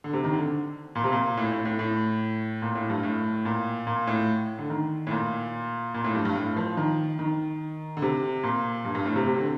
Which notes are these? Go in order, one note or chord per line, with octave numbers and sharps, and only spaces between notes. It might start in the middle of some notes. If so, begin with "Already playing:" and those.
D3
C3
D#3
D3
A#2
C3
A#2
A2
A2
A2
A2
A#2
A2
G2
A2
A#2
A#2
A2
D3
D#3
A2
A#2
A#2
A2
G2
G2
A2
F3
D#3
D#3
D3
C3
A#2
G2
G2
A2
C3
C3
D3